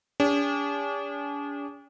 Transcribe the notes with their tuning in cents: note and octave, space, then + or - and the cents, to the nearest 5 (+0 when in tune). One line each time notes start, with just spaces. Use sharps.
D4 -45 G#4 -45